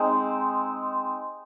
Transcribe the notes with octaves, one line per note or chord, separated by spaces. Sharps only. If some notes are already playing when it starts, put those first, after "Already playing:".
Already playing: G#3 C4 D#4